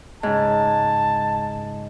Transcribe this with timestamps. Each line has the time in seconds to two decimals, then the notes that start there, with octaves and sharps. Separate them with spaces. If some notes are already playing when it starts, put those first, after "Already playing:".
0.23 G#2 C#3 A5